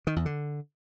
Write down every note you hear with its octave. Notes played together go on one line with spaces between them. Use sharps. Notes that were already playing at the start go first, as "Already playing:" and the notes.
D#3
E2
D3